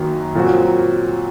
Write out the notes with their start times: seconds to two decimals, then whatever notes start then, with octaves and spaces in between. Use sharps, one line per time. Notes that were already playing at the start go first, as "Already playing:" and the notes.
Already playing: F#2 D#3 F#3 A#3
0.35 A#2 F#3 C4 F#4